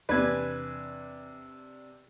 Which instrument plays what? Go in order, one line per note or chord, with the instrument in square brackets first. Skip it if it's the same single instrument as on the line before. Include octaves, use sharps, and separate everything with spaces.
[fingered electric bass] E2 F3 [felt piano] C3 D4 [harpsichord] B4 G#5